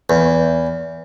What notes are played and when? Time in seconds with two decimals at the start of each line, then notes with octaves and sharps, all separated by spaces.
0.10 E2